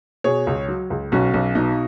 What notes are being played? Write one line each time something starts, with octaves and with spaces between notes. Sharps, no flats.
B2 G#4 C#5
C#2
F#3
C#2
B1 C#4 F#4
B1
B2 D#4